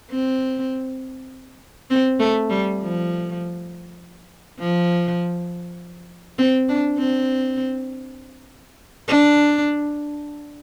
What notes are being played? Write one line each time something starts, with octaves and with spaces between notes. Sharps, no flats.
C4
C4
A3
G3
F3
F3
C4
D4
C4
D4